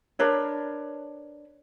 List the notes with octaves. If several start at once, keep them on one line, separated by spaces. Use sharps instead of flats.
D4 A#4 B4 C#5